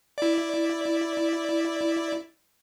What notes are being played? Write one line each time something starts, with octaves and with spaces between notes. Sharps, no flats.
E4 D5